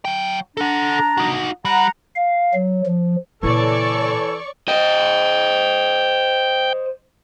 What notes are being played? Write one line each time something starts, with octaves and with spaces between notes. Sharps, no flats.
F#3 G5
D4 A4 F#5 A#5
D#4 F#4
G3 F#5 A#5
F5
F#3
F3
A#2 C#3 E3 A4 C#5 D5 C#6
C5 D#5 G5